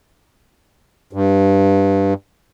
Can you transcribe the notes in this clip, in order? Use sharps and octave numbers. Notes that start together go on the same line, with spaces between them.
G2